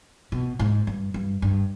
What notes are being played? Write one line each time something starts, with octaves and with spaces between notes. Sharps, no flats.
B2
G#2
G2
G2
G2